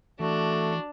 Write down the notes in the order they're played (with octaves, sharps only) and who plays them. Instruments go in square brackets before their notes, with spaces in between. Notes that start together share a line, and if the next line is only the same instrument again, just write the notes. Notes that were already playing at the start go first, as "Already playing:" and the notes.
[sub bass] E3 [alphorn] A3 [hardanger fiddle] D4 [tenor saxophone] F#4